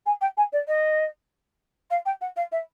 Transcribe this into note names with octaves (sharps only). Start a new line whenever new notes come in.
G#5
G5
G#5
D5
D#5
F5
G5
F#5
F5
E5